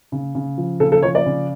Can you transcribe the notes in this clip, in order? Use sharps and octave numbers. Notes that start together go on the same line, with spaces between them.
C#3
C#3
F3
C#3 A4
A4
F3 C#5
D5
C#3